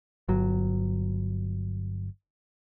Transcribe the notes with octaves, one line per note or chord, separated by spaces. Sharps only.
G1 F#3